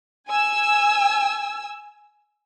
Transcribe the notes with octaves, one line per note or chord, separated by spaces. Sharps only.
G#5 E6